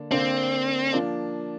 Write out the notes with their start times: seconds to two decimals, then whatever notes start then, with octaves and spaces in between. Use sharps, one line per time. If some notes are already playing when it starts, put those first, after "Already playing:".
Already playing: D3 A#3 D4
0.11 D3 A#3 C4 D4
0.93 F3 A#3 D4